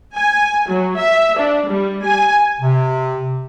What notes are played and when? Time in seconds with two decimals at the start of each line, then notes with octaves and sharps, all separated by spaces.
0.18 G#5
0.68 F#3
0.98 E5
1.38 D4
1.67 G3
2.04 G#5
2.61 C3